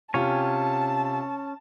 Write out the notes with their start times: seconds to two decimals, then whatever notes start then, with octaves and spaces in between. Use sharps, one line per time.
0.14 C3 C#4 F4 G4 C#5 G#5 A5